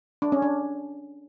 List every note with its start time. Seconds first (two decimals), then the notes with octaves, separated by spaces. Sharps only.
0.22 D4
0.32 C#4
0.42 D4